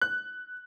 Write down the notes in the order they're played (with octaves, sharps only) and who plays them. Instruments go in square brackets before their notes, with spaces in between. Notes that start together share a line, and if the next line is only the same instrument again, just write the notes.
[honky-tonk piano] F#6